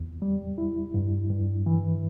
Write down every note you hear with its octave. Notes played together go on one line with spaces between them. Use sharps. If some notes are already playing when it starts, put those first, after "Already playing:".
Already playing: E2
G3
E4
G2
G2
E3